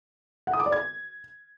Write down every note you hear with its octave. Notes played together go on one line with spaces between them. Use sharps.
F#5
D#6
D6
D5
G#6